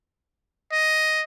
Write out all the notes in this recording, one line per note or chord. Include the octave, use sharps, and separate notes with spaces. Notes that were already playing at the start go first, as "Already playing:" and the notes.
D#5